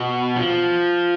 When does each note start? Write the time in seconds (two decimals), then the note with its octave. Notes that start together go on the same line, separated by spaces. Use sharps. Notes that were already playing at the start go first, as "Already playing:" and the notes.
Already playing: B2
0.36 F3